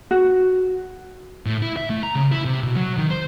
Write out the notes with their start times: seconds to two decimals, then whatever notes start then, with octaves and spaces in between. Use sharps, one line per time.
0.11 F#4
1.46 A2
1.62 E4
1.77 E5
1.90 A3
2.03 A#5
2.15 C#3
2.32 E4
2.45 C3
2.63 B2
2.76 F#3
2.98 D#3
3.11 C5